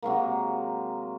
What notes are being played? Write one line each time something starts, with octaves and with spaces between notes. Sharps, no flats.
C3 F#3 G#3 A#3